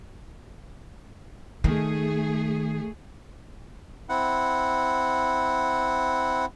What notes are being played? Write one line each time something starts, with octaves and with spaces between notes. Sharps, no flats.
D#3 A3 G#4
C4 E4 F#5